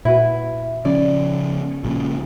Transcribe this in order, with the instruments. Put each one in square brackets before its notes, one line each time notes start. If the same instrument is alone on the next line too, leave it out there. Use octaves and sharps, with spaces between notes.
[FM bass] A#2 [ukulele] E4 F#4 B4
[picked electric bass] C#3 F3 C#4 [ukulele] D5
[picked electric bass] A#1 A#2 C#3